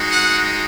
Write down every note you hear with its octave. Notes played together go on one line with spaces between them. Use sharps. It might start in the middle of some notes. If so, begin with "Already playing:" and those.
Already playing: G#3 D#4 F#4
F#5